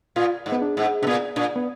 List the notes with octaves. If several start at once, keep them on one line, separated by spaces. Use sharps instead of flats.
A#2 F4
G#2
B3
D4
G#2
B2 D4
A#2 B3
A#2 D4
B3